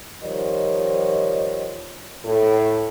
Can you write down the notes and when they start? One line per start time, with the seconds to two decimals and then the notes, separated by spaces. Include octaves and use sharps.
0.22 D#3 F3 G3 C#5 D#5
2.25 A2